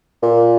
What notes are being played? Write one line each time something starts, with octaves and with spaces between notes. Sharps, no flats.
A#2